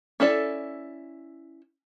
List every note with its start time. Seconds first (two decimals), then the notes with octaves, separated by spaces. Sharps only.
0.20 C#4 E4 A4 D5